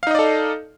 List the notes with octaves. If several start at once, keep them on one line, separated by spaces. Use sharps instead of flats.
D#4 A4 D5 D#5 F5